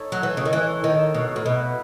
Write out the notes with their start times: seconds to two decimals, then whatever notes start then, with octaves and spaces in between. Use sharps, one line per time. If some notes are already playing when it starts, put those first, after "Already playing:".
Already playing: D#4 A4 C#5
0.12 F#3
0.23 E3
0.37 C#3
0.45 D#3
0.53 E3
0.84 D#3
1.14 B2
1.36 A2
1.46 B2 B3 E4 B4 F#5